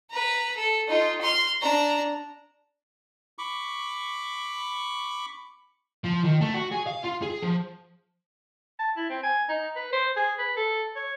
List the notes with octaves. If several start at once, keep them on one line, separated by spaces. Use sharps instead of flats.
B4 A#5
A4
D#4 F4
C6 F6
D4 A#5
B5 C#6 D6
F3
D#3
A3
F#4
G#4
F5
F4
G#4
F3
A5
E4
C4
G#5
D#4
B4
C5
G#4
B4
A4
C#5